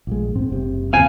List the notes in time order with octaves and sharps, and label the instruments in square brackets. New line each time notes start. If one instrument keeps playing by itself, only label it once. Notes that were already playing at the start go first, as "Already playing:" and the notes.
[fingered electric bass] A#1 G#3
G#2 C4
F#1 C3
[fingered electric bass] G#1 D#2 C4 [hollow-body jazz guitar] F5 G#5